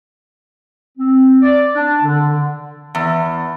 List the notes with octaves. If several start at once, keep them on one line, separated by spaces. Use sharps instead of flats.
C4
D5
D4
D3
E2